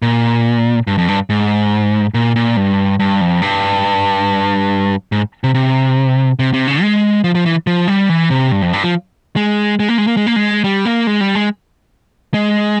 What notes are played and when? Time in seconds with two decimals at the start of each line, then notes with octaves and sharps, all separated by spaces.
0.02 A#2
0.87 G2
0.98 F2
1.08 G2
1.30 G#2
2.14 A#2
2.36 A#2
2.57 G2
3.00 G2
3.21 F2
3.42 G2
5.12 G#2
5.44 C3
5.54 C3
6.39 C3
6.54 C3
6.68 C#3
6.82 G#3
7.24 F3
7.35 F3
7.46 E3
7.67 F3
7.88 G3
8.09 E3
8.30 C3
8.52 G2
8.62 F2
8.73 G2
8.84 F3
9.36 G#3
9.80 G#3
9.89 A#3
9.98 G#3
10.07 A#3
10.17 G#3
10.27 A#3
10.36 G#3
10.64 G3
10.85 A#3
11.07 G#3
11.21 G3
11.35 G#3
12.34 G#3